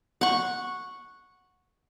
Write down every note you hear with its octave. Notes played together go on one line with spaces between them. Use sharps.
F#5 C#6